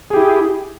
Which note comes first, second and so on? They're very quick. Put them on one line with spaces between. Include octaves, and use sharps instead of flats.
G#4 G4 E4